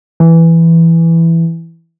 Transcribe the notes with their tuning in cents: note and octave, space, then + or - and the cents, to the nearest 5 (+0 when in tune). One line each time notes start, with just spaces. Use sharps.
E3 +5